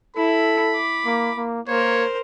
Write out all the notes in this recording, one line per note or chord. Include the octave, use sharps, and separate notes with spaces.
E4 A4 B5
D6
A#3
A#3
A#3 A#4 C5 C#5